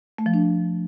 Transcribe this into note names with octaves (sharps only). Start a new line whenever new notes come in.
A3
F3
D4